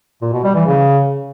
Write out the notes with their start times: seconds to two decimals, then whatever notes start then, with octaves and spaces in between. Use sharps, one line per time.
0.22 A#2
0.33 B2
0.44 G3
0.55 E3
0.66 C#3